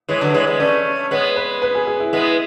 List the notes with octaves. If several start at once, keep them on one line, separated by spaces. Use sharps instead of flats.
E3 G#3 C#5
D3 F#3
E3 G#3 C#5
G#3 B3
A3 C#4 D5
G#3 B3 C#5
B4
B4
G#4
G#4
E4
G#3 B3 E4